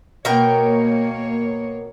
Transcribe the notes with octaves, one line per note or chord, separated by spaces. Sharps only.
B2 A#3 A#4 C#5 G5